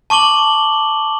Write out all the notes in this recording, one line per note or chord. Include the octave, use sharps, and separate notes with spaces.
A5 C#6 D6 F#7 G7